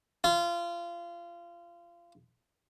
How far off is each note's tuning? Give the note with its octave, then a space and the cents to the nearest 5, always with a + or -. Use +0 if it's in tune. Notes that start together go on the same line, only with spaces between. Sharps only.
F4 -25